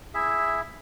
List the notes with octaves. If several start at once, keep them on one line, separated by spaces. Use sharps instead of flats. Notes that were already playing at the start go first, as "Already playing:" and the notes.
E4 G#4 E5